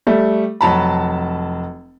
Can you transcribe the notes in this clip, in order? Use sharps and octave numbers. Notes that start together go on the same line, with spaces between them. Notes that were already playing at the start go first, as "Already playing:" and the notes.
G3 A3
F1 F#3 A5 B5